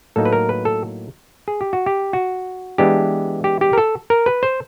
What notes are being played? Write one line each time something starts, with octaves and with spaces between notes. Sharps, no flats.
A2 F#3 A#3 D#4 A4
B4
A#4
B4
A4
G#4
G4
F#4
G4
F#4
E3 G#3 B3 D4 G4
G4
G4
A#4
A4
A#4
B4
C5